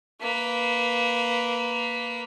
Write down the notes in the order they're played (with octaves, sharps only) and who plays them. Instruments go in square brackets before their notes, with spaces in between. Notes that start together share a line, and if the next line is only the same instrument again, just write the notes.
[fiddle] A#3 B4